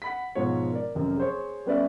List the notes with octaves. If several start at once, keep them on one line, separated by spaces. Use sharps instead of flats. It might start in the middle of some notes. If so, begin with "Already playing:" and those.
F#5 B5 B6
G#2 B2 F3 F#4 C#5
A#4 D5
F1 F#2 A#4
G#4 C5 C#5
G3 B3 C#4 B4 D5 E5